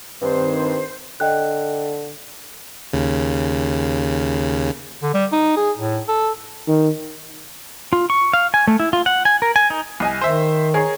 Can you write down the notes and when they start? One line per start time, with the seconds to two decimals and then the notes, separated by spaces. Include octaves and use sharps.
0.22 G2 D#3 C4 C5
1.20 D3 D#5 G5 F#6
2.93 D#2 C#3
5.03 D3
5.14 G3
5.32 D#4
5.56 G#4
5.77 A2
6.08 A4
6.68 D#3
7.93 F4
8.10 C#6
8.33 F5
8.54 G#5
8.68 A3
8.80 E4
8.93 F4
9.06 F#5
9.25 G#5
9.42 A#4
9.56 G#5
9.70 D#4
10.00 C2 D#5 G#5
10.21 D#3 C5 E5
10.74 G#4 A#4 C#5